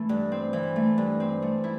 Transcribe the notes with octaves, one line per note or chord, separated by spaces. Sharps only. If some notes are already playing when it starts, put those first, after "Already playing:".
Already playing: E3 A3
G2
C4
E3
A3
G2
C4
A3
E4